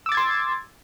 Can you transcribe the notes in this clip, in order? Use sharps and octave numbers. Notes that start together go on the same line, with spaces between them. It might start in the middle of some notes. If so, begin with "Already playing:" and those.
C6 D6 E6 G#6 A6